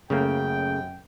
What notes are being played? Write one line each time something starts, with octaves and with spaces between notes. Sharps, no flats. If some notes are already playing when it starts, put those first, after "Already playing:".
F#2 C#3 A3 A#3 G5